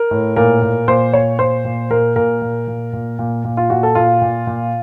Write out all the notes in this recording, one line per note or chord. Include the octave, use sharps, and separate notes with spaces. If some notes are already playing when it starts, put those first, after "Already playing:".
Already playing: A#4
A2
A#2 A#4
A#2
A#2 C5
A#2 C#5
A#2 C5
A#2
A#2 A#4
A#2 A#4
A#2
A#2
A#2
A#2
A#2
F4
A#2 F#4
A4
A#2 F4
A#2
A#2